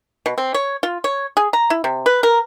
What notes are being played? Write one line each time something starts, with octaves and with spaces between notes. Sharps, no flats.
B2
C4
C#5
F4
C#5
G#4
A#5
E4
C3
B4
A#4